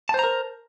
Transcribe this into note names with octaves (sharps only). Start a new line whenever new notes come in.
A#4 C5 A5 A#5